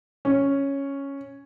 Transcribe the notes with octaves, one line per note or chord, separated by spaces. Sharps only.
C#4